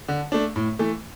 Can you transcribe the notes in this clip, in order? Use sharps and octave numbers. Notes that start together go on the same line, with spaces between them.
D3
A3 D4
A2
E3 A3